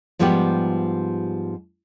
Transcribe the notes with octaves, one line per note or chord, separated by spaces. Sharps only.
G#2 F3 G3 B3 G4